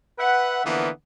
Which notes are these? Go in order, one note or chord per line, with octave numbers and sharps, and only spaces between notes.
B4 E5 F#5
D3 E3 F3 A#3 B3